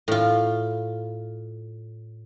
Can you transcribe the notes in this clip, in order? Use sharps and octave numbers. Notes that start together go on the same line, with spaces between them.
A2 F4